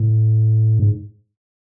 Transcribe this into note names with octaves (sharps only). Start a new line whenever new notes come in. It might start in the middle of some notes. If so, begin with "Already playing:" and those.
Already playing: A2
G#2